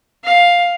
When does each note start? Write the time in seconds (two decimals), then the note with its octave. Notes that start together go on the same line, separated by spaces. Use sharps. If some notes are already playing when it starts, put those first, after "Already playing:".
0.24 F5